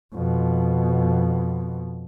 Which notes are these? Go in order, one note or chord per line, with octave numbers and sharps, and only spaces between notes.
F2 B2